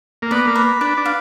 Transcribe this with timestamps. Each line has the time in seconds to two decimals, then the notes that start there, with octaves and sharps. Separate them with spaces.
0.22 A#3
0.31 B3 D5
0.47 A#3
0.55 B4
0.81 D4 B4
0.97 D4
1.05 F5